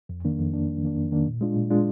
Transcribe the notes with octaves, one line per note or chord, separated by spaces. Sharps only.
F2
D#3 A#3 D4
F2
D#3 A#3 D4
F2
D#3 A#3 D4
F2
D#3 A#3 D4
A#2
G#3 D4 F4
A#2
G#3 D4 F4